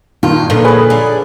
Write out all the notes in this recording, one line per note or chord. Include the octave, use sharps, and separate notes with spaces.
G2 A#2 D#3 F4
A#2 D3 F3 B3
G#4 B4 C#5 D#5 A5
D4 A4 F5